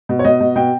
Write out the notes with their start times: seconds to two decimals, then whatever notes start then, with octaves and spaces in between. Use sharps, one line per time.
0.09 B2
0.19 C#5
0.25 B2 D#5
0.41 B2
0.56 B2 G5